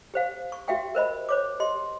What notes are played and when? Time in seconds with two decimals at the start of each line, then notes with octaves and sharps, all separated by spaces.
0.14 G4 C5 F5
0.52 C#6
0.68 F#4 G4 E5 F5 G5 C#6
0.95 A#4 C5 D#5 B5
1.29 C5 C#5 D6
1.60 G4 D#5 C6